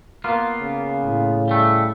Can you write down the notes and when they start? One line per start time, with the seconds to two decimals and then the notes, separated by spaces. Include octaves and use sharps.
0.24 A#3 B3 F4
0.61 C#3
1.03 A2
1.48 G3 A3